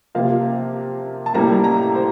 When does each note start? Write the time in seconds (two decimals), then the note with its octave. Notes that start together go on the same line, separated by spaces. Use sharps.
0.15 C3 F3 A#3 F5
1.26 A5
1.34 A2 G3 A#3 A#5
1.64 A#5
1.94 C5